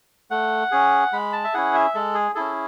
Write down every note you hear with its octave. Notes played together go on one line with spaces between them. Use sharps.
A3 F#5
C#4 G#4
G#3 B5
A5
E5
C#4 E4 G#4 F#5
E5
G#3 A4
G#4
C#4 E4 G#4 A4